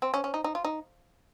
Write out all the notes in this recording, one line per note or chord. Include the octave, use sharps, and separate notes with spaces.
C4
C#4
C#4
D#4
D#4
F4
D#4